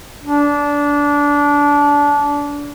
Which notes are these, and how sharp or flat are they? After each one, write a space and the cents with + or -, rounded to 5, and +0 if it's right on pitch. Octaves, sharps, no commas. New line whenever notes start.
D4 -20